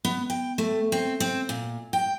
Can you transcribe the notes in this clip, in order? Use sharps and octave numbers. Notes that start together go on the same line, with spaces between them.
B3
G5
A3
C4
C4
A#2
G5